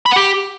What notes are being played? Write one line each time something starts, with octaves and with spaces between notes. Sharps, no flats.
B5
F#5
G4